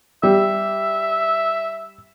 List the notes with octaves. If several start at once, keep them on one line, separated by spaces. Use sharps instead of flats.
G3 E5